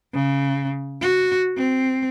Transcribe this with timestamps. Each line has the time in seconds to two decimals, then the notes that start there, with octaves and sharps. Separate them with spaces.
0.13 C#3
1.01 F#4
1.57 C4